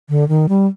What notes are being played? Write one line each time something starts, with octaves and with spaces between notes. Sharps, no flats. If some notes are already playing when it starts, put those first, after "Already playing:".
D3
D#3
G3